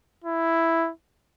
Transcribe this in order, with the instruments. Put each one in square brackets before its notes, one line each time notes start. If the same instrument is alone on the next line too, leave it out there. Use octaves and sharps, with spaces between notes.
[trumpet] E4